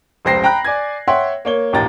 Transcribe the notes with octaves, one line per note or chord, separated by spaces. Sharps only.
F1 C#2 C5 G5 A#6 C7
G5 A#5 B5 F#6
D5 G#5 G#6
C#5 E5 F#5 G5 C6
A#3 C#5 G7
A1 D#2 A#2 G5 A#5 A6